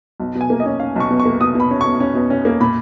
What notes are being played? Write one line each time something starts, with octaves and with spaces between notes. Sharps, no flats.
B1
B2
G#5
A#3
D#5
C#4
C#4 F5
B1 C#6
B2
C#6
A#3
B2 D#6
B2 B5
C#4
B2 C#6
C#4
B2
C#4
A#3
A#2 B5